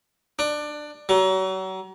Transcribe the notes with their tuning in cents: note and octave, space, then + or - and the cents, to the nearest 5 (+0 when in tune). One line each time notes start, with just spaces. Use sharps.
D4 +20
F#3 +35